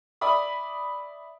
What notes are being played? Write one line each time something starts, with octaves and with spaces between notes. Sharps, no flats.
D5 E5 B5 D#6